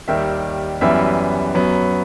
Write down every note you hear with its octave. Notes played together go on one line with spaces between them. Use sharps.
D#2 D#3 G3 E5
F#2 E3 G3 B3 E5
F#2 F#3 B3